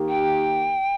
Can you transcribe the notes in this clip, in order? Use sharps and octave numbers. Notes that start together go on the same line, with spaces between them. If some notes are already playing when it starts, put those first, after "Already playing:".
Already playing: D#3 A#3 D#4 G4
G5